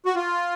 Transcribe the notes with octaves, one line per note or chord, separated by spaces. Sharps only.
F#4
F4